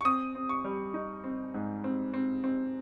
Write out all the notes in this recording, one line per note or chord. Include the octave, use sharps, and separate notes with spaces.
C#6
C4 D#6
C4
C#6
G3
D#4
C4
G#2
C4
C4
C4